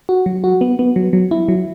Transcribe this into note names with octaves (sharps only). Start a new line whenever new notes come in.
F#4
F#3
F#4
B3
B3
F#3
F#3
E4
F#3